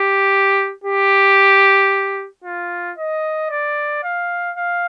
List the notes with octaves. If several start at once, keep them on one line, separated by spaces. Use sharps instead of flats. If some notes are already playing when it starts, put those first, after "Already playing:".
Already playing: G4
G4
F4
D#5
D5
F5
F5